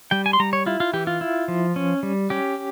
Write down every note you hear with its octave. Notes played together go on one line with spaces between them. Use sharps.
G3 G5
G#5
C6
G3 A#5
C#5
E4 F4
F4
E3 G4
F4
E4
F3
C#4
G3
C#4 G4